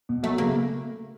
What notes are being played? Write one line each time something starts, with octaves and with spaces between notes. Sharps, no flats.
B2
F#3 A3
C#3 A#3